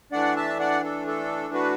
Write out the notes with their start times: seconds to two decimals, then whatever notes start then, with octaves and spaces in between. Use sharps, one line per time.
0.12 E3 A3 D4 D5 F#5
0.36 E5 A5
0.60 D5 F#5
0.84 A4
1.08 A4
1.54 F#4 B4